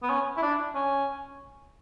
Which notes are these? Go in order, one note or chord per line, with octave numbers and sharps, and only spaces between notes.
B3
C#4
E4
D4
C#4